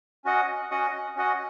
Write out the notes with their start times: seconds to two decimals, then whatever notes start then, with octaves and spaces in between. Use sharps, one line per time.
0.25 C#4 F#4 D#5 F#5
0.71 C#4 F#4 D#5 F#5
1.16 C#4 F#4 D#5 F#5